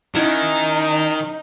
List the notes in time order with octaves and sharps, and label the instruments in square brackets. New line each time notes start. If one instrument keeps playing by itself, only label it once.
[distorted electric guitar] D#3 [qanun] C#4 E4 F#5 [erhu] D#4